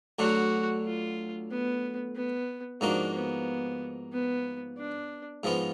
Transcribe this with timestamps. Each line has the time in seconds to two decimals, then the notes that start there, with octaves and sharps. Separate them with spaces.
0.19 D2 D3 F#3 D4 F#4
0.85 F4
1.50 B3
2.16 B3
2.81 G#2 F3 A#3 D4 D#4 F#4
3.14 B3
4.12 B3
4.78 D4
5.43 G#2 F3 G#3 B3 F4